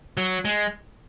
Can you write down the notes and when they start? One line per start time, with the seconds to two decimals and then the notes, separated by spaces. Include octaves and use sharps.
0.17 F#3
0.45 G#3